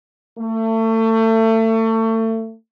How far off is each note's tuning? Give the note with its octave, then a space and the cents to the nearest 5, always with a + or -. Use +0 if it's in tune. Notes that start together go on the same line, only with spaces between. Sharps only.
A3 +30